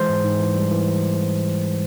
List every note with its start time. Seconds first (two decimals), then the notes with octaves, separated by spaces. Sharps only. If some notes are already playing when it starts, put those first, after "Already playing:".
Already playing: E3 G#3 C5
0.09 G#2
0.24 G#2
0.39 E3
0.55 G3
0.71 E3